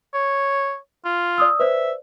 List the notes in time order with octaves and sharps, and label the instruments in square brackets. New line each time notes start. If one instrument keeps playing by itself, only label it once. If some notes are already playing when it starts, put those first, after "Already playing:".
[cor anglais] C#5
F4
[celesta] D5 D#6 E6
[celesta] B4 C5 D5 [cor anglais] E5